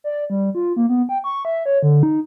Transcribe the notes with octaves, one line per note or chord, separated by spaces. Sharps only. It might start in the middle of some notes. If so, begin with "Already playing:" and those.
D5
G3
F4
A#3
B3
G5
C#6
E5
C#5
D3
D#4